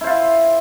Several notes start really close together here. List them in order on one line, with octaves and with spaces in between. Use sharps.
E4 C5 F4 E5